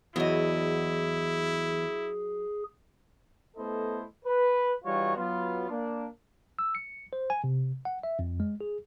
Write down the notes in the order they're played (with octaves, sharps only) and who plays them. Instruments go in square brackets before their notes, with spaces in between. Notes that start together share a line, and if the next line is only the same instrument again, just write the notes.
[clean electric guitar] E2 [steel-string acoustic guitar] F#3 D#5 [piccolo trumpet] E4 [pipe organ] G#4
[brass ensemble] A3 B3 E4 A4 C5 D#5
B4
E3 G3 D#4 F4 F#4 C#5
F#3 B3 F4
A#3 D4
[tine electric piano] E6
C#7
C5
G#5
C3
F#5
E5
F2
G#3
G#4